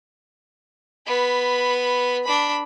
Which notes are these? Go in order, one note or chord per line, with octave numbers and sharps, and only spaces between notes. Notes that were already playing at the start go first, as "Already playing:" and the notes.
B3 B5
D4 B5